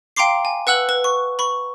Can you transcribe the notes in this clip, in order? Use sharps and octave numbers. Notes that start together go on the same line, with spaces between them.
F5 G5 A#5 C6 D6 C7
G#5
B4 F#5 E6 F#6 F#7
B4
C#6
B5 C#6